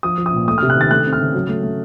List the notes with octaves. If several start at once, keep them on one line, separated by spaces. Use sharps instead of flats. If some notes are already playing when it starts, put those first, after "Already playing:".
F3 D#6
F3
D#6
A#2
A3 D#6
C3 F6
F#6
D#3 A6
A3 F#6
C4
F6
C#3
F#3
A3
A3